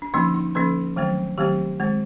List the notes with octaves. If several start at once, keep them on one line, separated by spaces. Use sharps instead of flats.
D4
D3 F3 A#3 C#4 D#4
D#4
D3 F3 A#3 C#4 A4
D#3 F#3 A3 C4
D#3 F#3 A3 C4 G4
D#3 G#3 C4